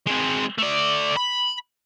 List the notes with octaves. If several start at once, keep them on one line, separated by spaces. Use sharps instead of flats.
G#3 C4
A3 D5
B5